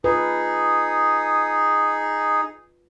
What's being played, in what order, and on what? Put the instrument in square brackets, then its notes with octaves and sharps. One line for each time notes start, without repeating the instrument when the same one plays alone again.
[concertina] D#4 G#4 [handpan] F4 B4